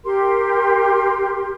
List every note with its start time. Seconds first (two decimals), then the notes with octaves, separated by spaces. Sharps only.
0.05 G4 A#4 C6